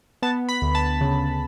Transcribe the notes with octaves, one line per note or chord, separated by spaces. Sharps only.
B3 A5
B5
D2
A5
C#3